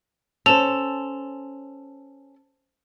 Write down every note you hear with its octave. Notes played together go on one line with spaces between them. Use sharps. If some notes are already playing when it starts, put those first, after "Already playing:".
C#4 A4 C5 E7 F7